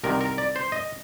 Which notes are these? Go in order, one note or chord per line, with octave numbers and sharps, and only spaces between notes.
C2 C3 D#3 A#4
A#4
D5
C5
D#5